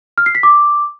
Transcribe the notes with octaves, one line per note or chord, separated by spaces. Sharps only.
F6
C7
B6
D6